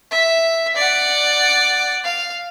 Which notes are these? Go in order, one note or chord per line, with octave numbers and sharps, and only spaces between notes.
E5
D5 F#5
F5